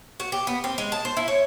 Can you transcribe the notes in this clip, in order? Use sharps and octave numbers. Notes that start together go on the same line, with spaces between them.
F#4
G4
B3
C4
G#3
A5
C5
E4
C#5